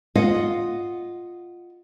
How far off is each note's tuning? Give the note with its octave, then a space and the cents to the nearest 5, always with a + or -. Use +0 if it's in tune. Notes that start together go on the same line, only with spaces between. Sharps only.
F4 +0 D#5 +0 F#5 +0